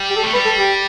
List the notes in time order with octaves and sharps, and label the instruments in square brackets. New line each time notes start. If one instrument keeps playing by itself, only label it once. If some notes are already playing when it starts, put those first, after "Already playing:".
Already playing: [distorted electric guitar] G3
[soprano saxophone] G4
A4
[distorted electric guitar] A3
[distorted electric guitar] G3 [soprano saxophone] B4
[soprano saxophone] A4
G4